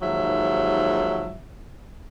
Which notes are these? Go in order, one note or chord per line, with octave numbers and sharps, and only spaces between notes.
D#2 G#2 F3 F#3 E5